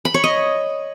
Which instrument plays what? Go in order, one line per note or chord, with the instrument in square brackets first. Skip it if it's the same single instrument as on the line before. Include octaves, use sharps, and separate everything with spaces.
[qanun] B5
C#5
D#5